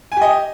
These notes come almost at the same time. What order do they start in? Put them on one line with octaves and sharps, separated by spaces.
G#5 G4 D#5